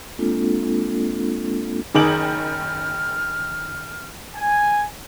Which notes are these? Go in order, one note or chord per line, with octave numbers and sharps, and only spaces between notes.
G#3 A#3 C4 D4 F4 A4
F#1 D#3 D#4 G#4 D6 F6 F#7
G#5